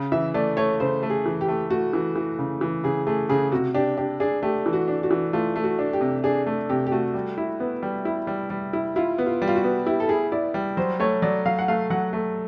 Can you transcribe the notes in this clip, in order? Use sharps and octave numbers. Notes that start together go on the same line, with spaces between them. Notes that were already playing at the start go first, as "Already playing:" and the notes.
Already playing: C#3
E3 E5
A3 D5
A3 C#5
C#3 C5
A3
G#4
E3
G4
A3
A3 F#4
E3
E3
C#3
E3
C#3 G#4
A3 G#4
C#3 G#4
C3 F#4
D4 G4
D4 G4
D4 G#4
A3 G4
E3
F#4
D4
F#4
E3
A3 F4
A3
F#4
D4
G4
C3
D4 G#4
A3
C3 G4
G4
A3 F#4
G3
E4
B3
G3
E4
G3
G3
E4
E4 F4
B3
F4
G3
F4
F#4
B3
E4 G4
A4
E4 G#4
E4 D5
G3
F#3 C5
A3 C#5
F#3 D5
F#3 F5
F#5
A3 F5
F#3 F#5
A3